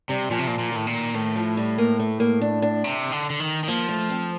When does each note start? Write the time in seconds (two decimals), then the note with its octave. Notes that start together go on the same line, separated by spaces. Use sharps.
0.09 C3 G3
0.30 A#2 F3
0.39 C3
0.47 A#2
0.59 A#2
0.72 A2 D#3
0.87 A#2
1.14 A2 D#3
1.36 F3
1.57 G3
1.78 A#3
1.99 A3
2.20 A#3
2.41 D4
2.62 D4
2.84 C3
3.12 D3
3.30 D3
3.40 D#3
3.63 D#3
3.68 F3 A#3
3.89 A3
4.10 C4